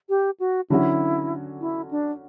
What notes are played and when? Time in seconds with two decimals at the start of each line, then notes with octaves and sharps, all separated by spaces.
0.09 G4
0.40 F#4
0.70 D3 F#3 C#4 E4 F#4
1.61 E4
1.91 D4